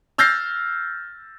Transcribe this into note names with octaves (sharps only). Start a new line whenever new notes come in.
E6 F6 G6 A6 A#6 C7